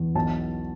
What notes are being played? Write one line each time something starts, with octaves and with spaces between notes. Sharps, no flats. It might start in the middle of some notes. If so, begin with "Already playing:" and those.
Already playing: E2
B1 A5